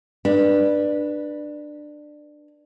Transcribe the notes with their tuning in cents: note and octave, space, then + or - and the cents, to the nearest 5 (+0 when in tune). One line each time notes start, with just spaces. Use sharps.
D4 +15 B4 -15